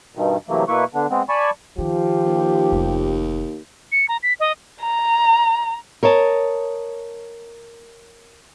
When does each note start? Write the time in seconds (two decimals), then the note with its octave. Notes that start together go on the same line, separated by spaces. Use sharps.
0.15 G2 B2 D#3
0.49 C3 E3 F#3 A3 A#3
0.68 B2 A#3 E4 B4 C#6
0.94 D3 B3 D4
1.11 G#3 B3 C4
1.29 D5 G#5 A5 B5 C#6
1.78 D#3 F3 G4
2.26 D#2
2.72 F1
3.92 C#7
4.09 A#5
4.23 B6
4.40 D#5
4.81 A#5
6.03 A#4 C#5 D#5 A5